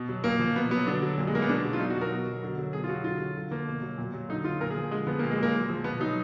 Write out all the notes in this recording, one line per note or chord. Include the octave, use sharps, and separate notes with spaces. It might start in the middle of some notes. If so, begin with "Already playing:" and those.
Already playing: B2
F#3
A#2 A#3
F3
B2 B3
F#3 B3
D3 D4
F#3
A#2
G#3
F#3 A#3
B3
B2 D4
F#3
F4
B2 D#4
F#4
F#3
A#4
B2
F#3
D3
F#3
B2 G#4
F4
F#3 F#4
D3 F4
F#3
D3
F3 A#3
B2
F#3
A#2
F#3
D3 D#4
F#3 F4
A#2 A#4
G#4
F3
D3 G#3
F3 B3
A#2 A#3
G#3
F#3 A#3
A#2
F3
B2 B3
F#3 D#4